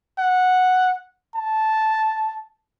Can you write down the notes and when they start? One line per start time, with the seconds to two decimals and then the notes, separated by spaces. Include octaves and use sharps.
0.19 F#5
1.35 A5